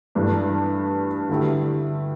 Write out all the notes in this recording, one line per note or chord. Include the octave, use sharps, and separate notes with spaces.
G2 E3 A3 D4
D3 A3 E4 G4